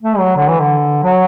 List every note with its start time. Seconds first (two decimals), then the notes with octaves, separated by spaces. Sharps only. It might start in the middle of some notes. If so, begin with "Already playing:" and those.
0.03 A3
0.19 F#3
0.36 D3
0.49 E3
0.60 D3
1.04 F#3